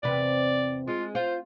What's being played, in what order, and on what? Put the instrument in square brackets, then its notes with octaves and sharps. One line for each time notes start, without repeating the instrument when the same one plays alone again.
[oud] E2 C3 B4 [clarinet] D5
[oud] G#3 [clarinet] F4
[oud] F4 [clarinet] C5